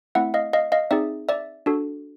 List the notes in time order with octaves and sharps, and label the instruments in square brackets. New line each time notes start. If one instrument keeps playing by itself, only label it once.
[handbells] A3 C4 E4 E5 F#5
D#5 F5
D#5 F5
D#5 F5
C4 D#4 G#4 D5 E5
D5 E5
D4 F#4 A4